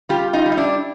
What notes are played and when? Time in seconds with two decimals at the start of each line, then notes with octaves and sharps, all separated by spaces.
0.09 G3 F4 G4
0.33 D#4 F4
0.46 G3
0.52 D#4
0.57 D4 E4